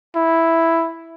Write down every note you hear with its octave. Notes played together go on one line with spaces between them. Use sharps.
E4